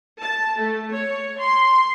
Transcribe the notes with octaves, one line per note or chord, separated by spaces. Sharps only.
A5
A3
C#5
C6